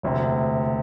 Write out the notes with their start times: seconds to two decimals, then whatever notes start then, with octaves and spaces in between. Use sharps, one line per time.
0.03 E1 D2 C3